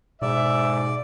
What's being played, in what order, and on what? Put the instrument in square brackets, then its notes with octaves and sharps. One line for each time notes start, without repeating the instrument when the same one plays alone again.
[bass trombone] G#2 [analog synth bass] B2 [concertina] D5 [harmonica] E5